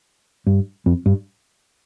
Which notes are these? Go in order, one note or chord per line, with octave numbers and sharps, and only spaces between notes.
G2
F2
G2